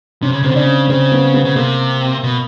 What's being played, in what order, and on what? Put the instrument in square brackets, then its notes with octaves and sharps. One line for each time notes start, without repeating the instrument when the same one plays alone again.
[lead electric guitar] C3 [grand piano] C#4
[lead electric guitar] C#3
[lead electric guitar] C3 [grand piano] C4
[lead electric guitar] D3
[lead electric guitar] C#3 [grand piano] D4
[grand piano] C#4
[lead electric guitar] C#3 [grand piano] C4
[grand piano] B3
B3
[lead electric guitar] C#3
[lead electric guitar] C3 [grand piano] A#3
[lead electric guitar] B2